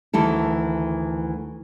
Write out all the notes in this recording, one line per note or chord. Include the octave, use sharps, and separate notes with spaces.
D2 D#3 E3 A3 A4